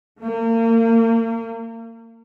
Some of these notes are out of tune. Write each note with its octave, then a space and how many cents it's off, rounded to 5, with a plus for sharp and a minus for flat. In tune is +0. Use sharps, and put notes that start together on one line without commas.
A#3 -35